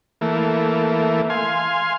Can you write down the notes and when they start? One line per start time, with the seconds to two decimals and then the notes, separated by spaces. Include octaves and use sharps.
0.21 E3 A3 A#3
1.30 F5 G#5 C6